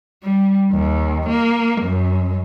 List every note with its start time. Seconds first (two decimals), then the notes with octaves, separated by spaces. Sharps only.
0.23 G3
0.71 D#2
1.29 A#3
1.82 F#2